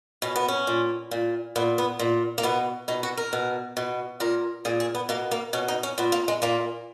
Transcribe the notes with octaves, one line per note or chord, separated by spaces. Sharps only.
B2 C#4
B3
C#4
A#2
A#2
A#2 B3
B3
A#2
A#3
B2 B3
B2 D#4
F#4
A#4
B2
B2
A#2 A#4
A#2 G#4
G#4
B3
B2 A#3
A#3
B2 C#4
D#4
C#4
A#2 B3
A#3
G#3
A#2 A#3